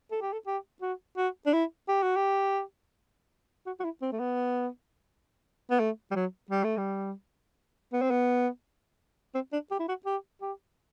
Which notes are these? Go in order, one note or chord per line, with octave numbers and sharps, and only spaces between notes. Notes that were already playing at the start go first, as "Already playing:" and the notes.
A4
G4
A4
G4
F#4
F#4
D4
E4
G4
F#4
G4
F#4
F#4
E4
C4
A3
B3
B3
A3
G3
F#3
G3
A3
G3
B3
C4
B3
C4
D4
G4
E4
F#4
G4
G4